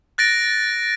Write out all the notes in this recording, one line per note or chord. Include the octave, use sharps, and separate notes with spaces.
F#6 A6 A#6 D7